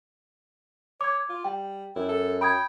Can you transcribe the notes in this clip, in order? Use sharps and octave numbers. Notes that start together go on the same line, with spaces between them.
C#5 D6 G#6
F4
G3 G5
F#2 E4
A4
G5 B5 D#6 G#6